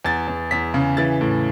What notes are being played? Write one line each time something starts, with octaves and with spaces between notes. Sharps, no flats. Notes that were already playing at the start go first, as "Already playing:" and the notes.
E2 A6
E2
E2 B6
C#3
E3 A6
A2